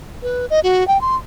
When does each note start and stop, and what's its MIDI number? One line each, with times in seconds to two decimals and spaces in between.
0.22 0.46 71
0.50 0.60 75
0.63 0.87 66
0.88 1.00 79
1.01 1.16 84